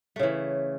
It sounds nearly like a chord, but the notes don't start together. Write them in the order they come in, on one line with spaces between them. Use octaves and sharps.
A3 C#3 E3